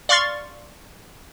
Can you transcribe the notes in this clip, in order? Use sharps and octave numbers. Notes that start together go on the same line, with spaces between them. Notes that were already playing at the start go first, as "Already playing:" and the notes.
D5 F5 C6 C#6 F6 A6